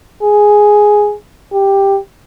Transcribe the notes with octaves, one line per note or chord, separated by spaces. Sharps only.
G#4
G4